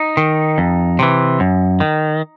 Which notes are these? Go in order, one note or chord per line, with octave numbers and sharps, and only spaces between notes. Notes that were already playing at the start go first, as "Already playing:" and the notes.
Already playing: D#4
D#3
F2
C3 E3
F#2
D#3